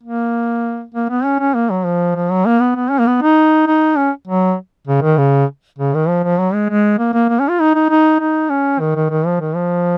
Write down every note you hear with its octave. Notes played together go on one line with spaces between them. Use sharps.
A#3
A#3
B3
C#4
C#4
A#3
F#3
F3
F3
F#3
A#3
B3
B3
C#4
A#3
B3
D#4
D#4
C#4
F#3
C#3
D#3
C#3
C#3
D#3
F3
F3
F#3
G#3
G#3
A#3
A#3
A#3
C#4
F4
D#4
D#4
D#4
D#4
C#4
D#3
D#3
D#3
F3
D#3
F3